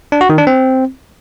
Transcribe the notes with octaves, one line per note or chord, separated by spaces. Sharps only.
D4
F#4
D#3
D4
C4